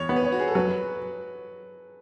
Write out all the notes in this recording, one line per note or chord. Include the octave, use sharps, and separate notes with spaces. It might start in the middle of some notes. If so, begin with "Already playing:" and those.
Already playing: E2 C#5
B3
B4
C#5
F#4
G#4
A4
F#3 B4